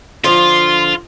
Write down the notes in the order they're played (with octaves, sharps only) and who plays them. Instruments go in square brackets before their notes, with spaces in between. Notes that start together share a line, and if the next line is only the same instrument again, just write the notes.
[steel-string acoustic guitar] D3 F3 [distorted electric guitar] F4 [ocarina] C6